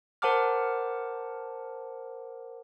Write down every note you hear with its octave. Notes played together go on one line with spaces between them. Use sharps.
A#4 C5 F#5 A5 D6 F6